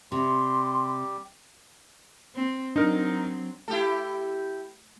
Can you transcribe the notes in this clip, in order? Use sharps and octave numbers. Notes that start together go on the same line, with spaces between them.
C3 G3 G4 C6
C4
F#3 C4 D4 D#4 A#4
A3 E4 G4 A4